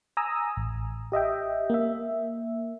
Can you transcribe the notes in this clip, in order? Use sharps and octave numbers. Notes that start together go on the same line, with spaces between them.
G#5 A#5 D#6 E6
A1
G4 D#5 E5 G5
A#3 E5